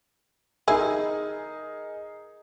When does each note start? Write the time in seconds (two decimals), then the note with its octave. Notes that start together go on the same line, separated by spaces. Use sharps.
0.68 D#3 D#4 E4 G#4 A#4 G#5